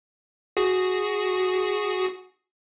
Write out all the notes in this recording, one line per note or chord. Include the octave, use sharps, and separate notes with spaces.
F#4 G#4